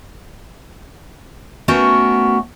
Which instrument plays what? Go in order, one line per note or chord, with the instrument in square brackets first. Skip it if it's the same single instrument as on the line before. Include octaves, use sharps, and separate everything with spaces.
[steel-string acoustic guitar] A3 B3 C#4 F#4 A#4